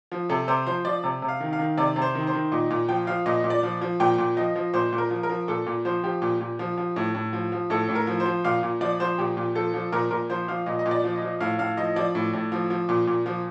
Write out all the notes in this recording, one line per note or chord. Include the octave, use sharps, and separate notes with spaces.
F3
C3 A4
C3 C5
F3 C5
F3 D5
C3
C3
F5
D#3
F5
D#3
C3 D5
C3
C5
D#3
C5
D#3
A#2 D#5
A#2
F3 G5
F3 F5
A#2 D#5
A#2
D5
F3
F3
A#2 G5
A#2
F3 D#5
F3
A#2 C5
A#2
A#4
F3
A#4
F3
A#2 A4
A#2
F3 C5
F3 G4
A#2
A#2
F3
F3
A2
A2
F3
F3
A2 A4
A2
A#4
F3
C5
F3
A#2 F5
A#2
F3 D5
F3 C5
A#2 G4
A#2
F3 A4
F3
A#2 A#4
A#2 A#4
F3 C5
F3 F5
A#2 D#5
D#5
A#2
D5
F3
D#5
F3
A2 F5
A2 F5
F3 D#5
F3 D5
A2
A2
F3
F3
A#2
A#2
F3